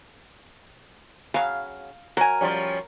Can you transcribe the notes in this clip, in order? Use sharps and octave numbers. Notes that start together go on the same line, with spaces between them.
C#3 F#3 F5
F#3 A#4 G#5
F3 G3 C#4